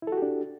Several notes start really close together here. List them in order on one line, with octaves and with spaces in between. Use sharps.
E4 A4 F#4 G4 D4